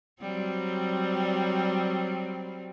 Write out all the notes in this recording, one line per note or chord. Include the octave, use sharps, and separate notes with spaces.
F#3 G3 C4